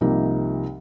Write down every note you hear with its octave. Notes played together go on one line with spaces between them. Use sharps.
C2 C3 F3 A#3 D#4